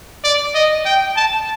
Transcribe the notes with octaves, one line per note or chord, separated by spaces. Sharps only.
D5
D#5
G5
A5